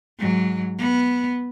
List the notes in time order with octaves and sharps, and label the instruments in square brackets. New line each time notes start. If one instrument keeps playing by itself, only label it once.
[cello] G#2 F#3
B3